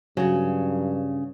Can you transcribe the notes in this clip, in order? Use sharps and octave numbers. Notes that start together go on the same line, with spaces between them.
G2 C#3 F#3 F#4